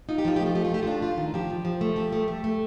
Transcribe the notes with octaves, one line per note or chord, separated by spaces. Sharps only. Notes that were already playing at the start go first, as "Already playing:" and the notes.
D#4 F4
G4
F3 F4
A3 G4
F4
A3 G4
F4
A3 G4
D4 F4
F4
D#3
F3 G4
F3
F3
A3
F3 G4
A3
A3
A3